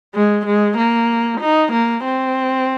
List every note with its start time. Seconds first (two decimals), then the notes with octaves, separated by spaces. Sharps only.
0.14 G#3
0.46 G#3
0.78 A#3
1.40 D#4
1.72 A#3
2.04 C4